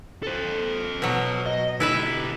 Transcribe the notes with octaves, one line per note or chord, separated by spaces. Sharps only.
A4 C5
B2 F#3
D#5
B3 E4 G4 B4 E5